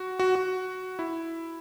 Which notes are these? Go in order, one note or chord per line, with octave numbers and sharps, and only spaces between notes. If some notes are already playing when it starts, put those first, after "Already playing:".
Already playing: F#4
F#4
F#4
E4